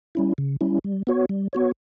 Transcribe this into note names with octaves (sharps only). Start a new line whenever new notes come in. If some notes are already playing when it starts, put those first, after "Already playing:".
G3 C#4 E4
C#3
G3 C#4 E4
G3
B3 F#4 C#5
G3
B3 F#4 C#5